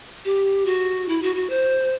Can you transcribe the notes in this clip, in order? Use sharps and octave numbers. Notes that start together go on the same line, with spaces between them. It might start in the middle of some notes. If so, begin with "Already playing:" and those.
G4
F#4
E4
F#4
F#4
C5